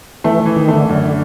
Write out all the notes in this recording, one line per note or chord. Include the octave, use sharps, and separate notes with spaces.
E3 A3
E3
D#3
A3
D3
F#2 D3